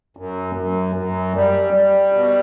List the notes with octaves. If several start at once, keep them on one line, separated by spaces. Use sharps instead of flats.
F#2
F#2
F#2
G3
G3
B2